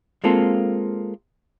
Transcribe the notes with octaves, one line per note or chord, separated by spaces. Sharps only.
G#3 A#3 C4 F4 A4